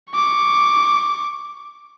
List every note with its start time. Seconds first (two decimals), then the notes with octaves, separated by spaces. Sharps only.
0.13 C#6 D6